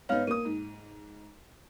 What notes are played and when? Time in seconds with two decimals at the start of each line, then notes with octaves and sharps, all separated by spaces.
0.09 G#2 B3 D#4 C#5 F5 F6
0.27 A#3 D#6 D#7
0.45 G#2